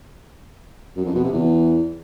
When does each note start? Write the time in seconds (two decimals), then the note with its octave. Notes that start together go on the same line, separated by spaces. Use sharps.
0.96 F#2
1.05 F2
1.15 B2
1.24 C3
1.33 E2